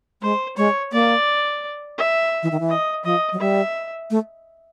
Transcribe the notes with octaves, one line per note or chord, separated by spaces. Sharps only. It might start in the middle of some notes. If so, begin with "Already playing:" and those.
G#3 C5
G#3 C#5
A#3 D5
E5
E3
D#3
E3
D#5
F3 D#5
F#3
G3 E5
A3